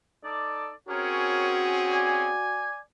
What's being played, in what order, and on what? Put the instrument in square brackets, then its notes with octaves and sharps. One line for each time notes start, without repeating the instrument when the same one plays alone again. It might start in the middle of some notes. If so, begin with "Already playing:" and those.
[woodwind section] D#4 A4 D5
[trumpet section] C4 C#4 G#4 [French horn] F#4 [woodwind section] A#4 C#5
[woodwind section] D5 G#5